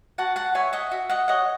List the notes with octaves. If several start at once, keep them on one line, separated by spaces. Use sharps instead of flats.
F#4 F#5 A5
F#5 A5
C#5 E5 G#5
D#5 F#5
F#4 E5
D#5 F#5
C#5 D#5 F#5